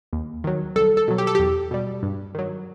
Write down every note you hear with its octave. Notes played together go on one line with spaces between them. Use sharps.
D#2
D#3 F#3
C2 A4
A4
B2 F#3
G4
A4
E2 G4
B2 G3
G2
D#3 F#3